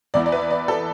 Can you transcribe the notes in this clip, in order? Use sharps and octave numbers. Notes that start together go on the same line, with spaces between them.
E2 E3 B3 E4 D5
D5
B4
D5
A4